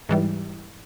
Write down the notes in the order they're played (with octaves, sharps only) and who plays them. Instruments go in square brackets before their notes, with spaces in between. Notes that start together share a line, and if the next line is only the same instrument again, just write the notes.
[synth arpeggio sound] G#2 E3 G3